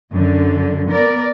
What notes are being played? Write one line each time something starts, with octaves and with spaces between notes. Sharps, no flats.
F#2 D3
B3 A#4 D5